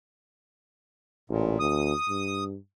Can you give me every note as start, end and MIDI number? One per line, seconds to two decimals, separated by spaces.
1.30 1.58 33
1.30 1.59 46
1.60 1.94 38
1.60 2.44 87
2.09 2.57 43